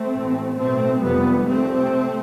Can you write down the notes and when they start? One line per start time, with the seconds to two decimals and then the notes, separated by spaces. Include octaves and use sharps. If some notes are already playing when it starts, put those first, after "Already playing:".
Already playing: A3 C4
0.11 A1 A2
0.57 B1 A2 A3 C4
1.03 F1 F2 C3 G3 B3
1.49 C2 C3 A3 C4